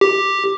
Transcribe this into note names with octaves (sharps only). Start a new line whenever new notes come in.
G4